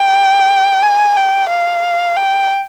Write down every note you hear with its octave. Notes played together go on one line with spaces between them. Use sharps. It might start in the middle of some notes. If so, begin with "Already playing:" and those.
Already playing: G5
G#5
G5
F5
G5